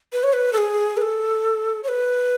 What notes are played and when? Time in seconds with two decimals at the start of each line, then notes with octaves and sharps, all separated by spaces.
0.13 B4
0.23 C#5
0.33 B4
0.53 A4
0.58 G#4
0.97 B4
1.01 A4
1.83 C#5
1.88 B4